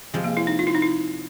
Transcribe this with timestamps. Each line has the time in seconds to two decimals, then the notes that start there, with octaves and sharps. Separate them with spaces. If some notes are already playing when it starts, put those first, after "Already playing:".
0.14 C3 F3 G#3
0.24 A#3
0.37 E4
0.47 D#4
0.59 F4
0.67 E4
0.75 D#4
0.82 E4